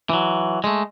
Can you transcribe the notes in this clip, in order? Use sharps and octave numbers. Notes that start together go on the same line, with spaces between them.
E3 F#3
G#3 A3